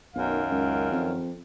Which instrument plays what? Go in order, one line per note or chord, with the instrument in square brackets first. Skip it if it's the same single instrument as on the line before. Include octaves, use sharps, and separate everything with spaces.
[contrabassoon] B1 [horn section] F#2 D#3 F5
[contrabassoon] C#2
F2